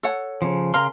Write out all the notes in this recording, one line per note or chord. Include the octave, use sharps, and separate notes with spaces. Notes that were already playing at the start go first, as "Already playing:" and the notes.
A4 C#5 F#5
C#3 F3
C#3 A#4 F5 A#5 C6